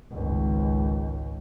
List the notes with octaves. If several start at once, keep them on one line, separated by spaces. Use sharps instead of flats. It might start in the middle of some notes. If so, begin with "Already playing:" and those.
G#1 C#2